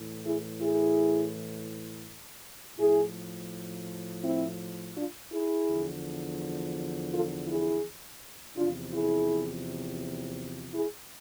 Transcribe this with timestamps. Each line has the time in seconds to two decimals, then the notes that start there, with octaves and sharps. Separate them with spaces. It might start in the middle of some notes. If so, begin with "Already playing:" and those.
Already playing: A2 E3
0.24 E4 G#4
0.60 E4 G#4
2.77 A2 F3 E4 G#4
4.22 C4 E4
4.95 D4 F4
5.30 E4 G#4
5.67 E2 D3 F3
7.12 F4 A4
7.47 E4 G#4
8.56 E2 C3 F3 D4 F4
8.92 E4 G#4
10.73 E4 G#4